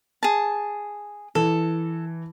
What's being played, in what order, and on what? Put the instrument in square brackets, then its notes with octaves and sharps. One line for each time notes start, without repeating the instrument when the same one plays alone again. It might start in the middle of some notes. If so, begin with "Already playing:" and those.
[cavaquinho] G#4 A5
[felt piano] E3 [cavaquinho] A4